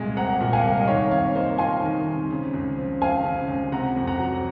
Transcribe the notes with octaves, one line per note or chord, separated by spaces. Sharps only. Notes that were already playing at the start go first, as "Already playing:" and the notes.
Already playing: C2 A#2 G#3
C4 F#5 A#5
A#2
F5 G#5
C2
D#5
D#3 C#5 F5
C3 C#5 F5
A#3 C5 D#5
F4 G#5 C6
D#3
C3
C#3
C#2
F3
C4 F5 G#5
C#3
C#2
C3 F#5 A#5
F2
F#5 A#5
F#3